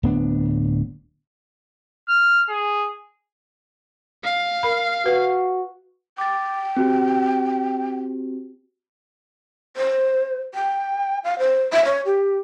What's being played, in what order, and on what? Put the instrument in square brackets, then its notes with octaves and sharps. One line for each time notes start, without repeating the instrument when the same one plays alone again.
[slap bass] D1 B3 D4
[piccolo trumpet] F6
G#4
[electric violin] F5
[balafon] A#4 B5
[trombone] F#4 [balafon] B4
[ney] G5 [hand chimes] D6 A6
[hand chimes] C4 F#4 G4
[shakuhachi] C5
G5
F5
C5
E5
C#5
G4